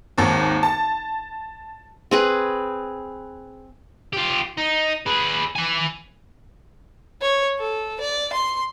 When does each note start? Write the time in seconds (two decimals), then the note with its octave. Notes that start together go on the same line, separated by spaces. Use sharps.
0.18 G#1 D#2
0.63 A5
2.11 C4 G#4 B4
4.13 F4 G4
4.58 D#4
5.06 G#4 B4
5.55 B4 G#5
7.22 C#5
7.59 A4
8.00 D5
8.33 C6